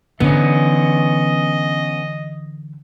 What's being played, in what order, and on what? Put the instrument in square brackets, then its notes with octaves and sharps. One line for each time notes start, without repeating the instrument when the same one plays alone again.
[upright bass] D3 E3 [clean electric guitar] B3 C#4 [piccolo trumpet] D#5